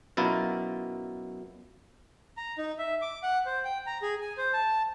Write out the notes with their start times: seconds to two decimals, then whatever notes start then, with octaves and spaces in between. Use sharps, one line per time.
0.17 F#2 B2 E4 F4 A#4
2.37 A#5
2.58 D#4
2.78 E5
3.02 D6
3.23 F#5
3.46 C5
3.64 G5
3.87 A#5
4.02 G#4
4.22 G#5
4.38 C5
4.53 A5